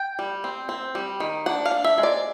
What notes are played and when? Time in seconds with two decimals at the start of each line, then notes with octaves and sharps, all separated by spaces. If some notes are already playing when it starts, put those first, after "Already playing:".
Already playing: G5
0.19 G3
0.44 C4
0.69 C4
0.95 G3
1.20 D#3
1.46 D4 F#5
1.66 F5
1.71 D4
1.84 E5
1.98 G#3
2.03 D5